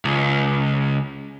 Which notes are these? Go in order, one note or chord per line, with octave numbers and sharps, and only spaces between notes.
C#2